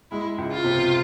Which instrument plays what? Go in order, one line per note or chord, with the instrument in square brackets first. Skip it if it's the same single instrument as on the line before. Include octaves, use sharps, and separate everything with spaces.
[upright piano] G#3 [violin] E4
[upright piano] C#2
[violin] F4
[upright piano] C3